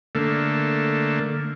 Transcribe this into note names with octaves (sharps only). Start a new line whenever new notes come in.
D3 A3 A#3